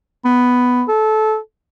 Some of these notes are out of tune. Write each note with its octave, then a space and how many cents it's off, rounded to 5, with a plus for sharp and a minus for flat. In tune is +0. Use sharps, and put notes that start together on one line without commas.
B3 +5
A4 -20